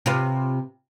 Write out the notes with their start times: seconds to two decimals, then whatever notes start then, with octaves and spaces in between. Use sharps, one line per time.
0.06 C3 F4 B4